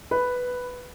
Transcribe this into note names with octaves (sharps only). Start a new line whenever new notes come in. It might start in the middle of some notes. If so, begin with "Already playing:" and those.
B4